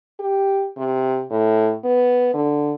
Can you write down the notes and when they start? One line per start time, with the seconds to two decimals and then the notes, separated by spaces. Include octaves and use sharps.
0.20 G4
0.77 C3
1.30 A2
1.84 B3
2.34 D3